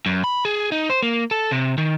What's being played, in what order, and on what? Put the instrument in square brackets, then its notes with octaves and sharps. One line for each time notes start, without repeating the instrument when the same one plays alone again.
[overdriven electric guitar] F#2
B5
G#4
D#4
C5
A#3
A4
C3
D#3